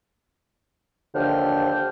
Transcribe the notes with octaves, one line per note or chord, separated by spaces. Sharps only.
D#2 D3 F3 G5 F6